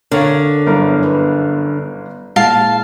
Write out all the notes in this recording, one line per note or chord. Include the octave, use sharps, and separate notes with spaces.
D3 A#4 C#5 F5
G1 F#2 B3 C#4 E4 A#4
B4
A#2 G#3 E4 F5 A5